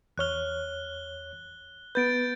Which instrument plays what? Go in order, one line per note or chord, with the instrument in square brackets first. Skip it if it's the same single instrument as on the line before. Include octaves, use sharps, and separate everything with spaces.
[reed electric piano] E2 C#5 F6 [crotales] F#6 G7
[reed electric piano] B3 B4 [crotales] G6 A6 D7